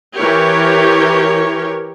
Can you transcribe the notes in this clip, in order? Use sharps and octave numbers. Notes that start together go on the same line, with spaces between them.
E3 G4 A#4 C#5